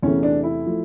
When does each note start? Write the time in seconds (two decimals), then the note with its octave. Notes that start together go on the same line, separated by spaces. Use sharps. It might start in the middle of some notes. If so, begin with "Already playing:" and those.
0.03 E2 C3 E3 A3 C#4
0.23 D4
0.43 E4
0.66 F3 A3